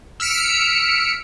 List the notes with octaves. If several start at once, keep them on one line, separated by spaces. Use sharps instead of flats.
E6 F6 B6 C#7 D7